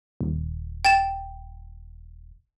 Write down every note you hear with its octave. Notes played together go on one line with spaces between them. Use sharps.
D#1
G5 A6 E7